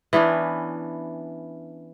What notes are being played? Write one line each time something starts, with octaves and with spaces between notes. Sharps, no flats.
E3 B3 C#4 D4